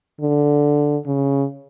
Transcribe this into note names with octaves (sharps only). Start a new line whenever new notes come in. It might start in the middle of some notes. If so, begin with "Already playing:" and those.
D3
C#3